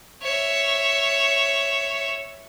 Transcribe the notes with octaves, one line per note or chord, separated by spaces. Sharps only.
C#5 E5